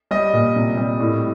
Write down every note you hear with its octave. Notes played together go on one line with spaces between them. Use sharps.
G3 D#5
A#2
C3
G3
A2